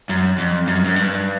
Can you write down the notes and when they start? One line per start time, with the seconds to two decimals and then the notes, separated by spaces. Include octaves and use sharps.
0.09 F#2
0.38 F2
0.67 F#2
0.85 F#2
0.96 G2